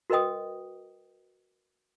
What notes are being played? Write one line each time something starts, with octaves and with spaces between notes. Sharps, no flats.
F#4 A#4 B4 D#5 G5 D#6